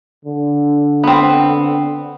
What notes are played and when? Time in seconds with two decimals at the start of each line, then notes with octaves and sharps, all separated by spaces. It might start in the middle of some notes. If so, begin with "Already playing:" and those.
0.25 D3
1.04 B3 C4